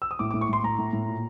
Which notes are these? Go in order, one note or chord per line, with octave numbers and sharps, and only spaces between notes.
E6
D#6
A2 D6
A2 D6
C#6
A2 C6
A2 A#5
A2
A2
A#2